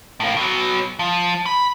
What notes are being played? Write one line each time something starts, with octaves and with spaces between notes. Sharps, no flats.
A2 A#3
B2 F#3
F3
B5